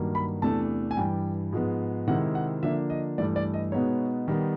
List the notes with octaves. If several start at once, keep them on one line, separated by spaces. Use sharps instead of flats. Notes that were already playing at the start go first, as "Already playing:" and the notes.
Already playing: G2 D#3 F#3 A#3
B5
E2 C3 E3 A3 D4 A5
G#5
G2 E3 G3 G5
G#2 F3 G#3 B3
C3 D#3 G#3 C4 E4 F#5
F#5
D3 F3 A#3 D4 E5
D#5
G2 E3 A3 D5
D5
D#5
B2 G#3 B3 D#4 C#5
D#3 G3 B3